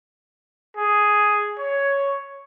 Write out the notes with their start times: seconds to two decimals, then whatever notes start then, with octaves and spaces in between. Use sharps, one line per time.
0.77 G#4
1.59 C#5